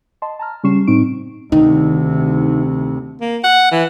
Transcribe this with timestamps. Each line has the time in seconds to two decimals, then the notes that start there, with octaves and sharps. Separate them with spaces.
0.22 D#5 A5 C6
0.39 A5 A#5 F6
0.63 C#3 G3 C#4 C#6 C7 E7
0.87 A2 C4 D#4 C#6 D7
1.52 D2 C3 D#3 D#4
3.21 A#3
3.44 F#5
3.72 E3